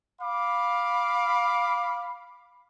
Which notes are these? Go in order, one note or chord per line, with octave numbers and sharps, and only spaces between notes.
F5 B5 D6